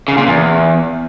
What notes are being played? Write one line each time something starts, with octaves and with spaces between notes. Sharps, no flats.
C#3
A#2
E2